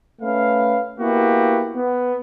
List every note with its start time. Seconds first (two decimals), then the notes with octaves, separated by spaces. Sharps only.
0.21 A3 C#4 B4 F5
0.99 A#3 B3 E4 F#4 G4
1.75 B3